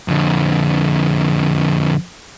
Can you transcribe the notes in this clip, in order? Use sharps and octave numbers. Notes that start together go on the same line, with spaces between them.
F2 D3